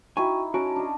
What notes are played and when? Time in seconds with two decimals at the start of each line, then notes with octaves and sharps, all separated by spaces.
0.17 D#4 E4 F#4 G5 G#5 C#6
0.54 C#4 F#4 A5 A#5 D7
0.76 D4 D#5